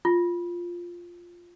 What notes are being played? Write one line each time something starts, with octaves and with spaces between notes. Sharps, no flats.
F4